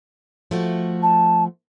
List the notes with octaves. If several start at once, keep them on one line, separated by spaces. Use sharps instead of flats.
F3 A3 F#4
A5